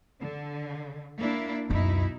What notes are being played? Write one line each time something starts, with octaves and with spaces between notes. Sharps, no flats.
D3
A#3 D4 E4
C#2 F#2 B2 D#4 E4